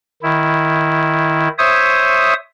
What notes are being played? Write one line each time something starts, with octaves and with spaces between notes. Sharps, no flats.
D#3 E4
C5 C#5 E5 D#6